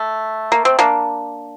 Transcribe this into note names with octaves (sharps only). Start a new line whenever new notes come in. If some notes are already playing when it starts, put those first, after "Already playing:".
Already playing: A3
A#3
C4
A#3 D4